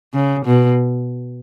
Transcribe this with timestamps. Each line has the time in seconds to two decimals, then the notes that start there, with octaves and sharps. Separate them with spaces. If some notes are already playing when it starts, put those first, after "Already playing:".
0.14 C#3
0.46 B2